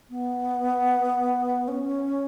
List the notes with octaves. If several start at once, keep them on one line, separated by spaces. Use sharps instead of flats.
B3
C#4